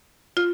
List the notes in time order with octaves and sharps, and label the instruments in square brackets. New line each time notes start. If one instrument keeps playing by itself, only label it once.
[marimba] F4